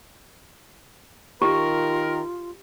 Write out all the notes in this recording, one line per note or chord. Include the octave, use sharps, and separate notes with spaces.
D#3 F4 G4 A#4